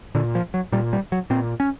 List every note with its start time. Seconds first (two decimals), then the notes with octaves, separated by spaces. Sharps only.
0.15 A#2 D3
0.35 F3
0.54 F#3
0.72 A#2 G3
0.93 G3
1.12 F#3
1.30 A#2 C4
1.60 C#4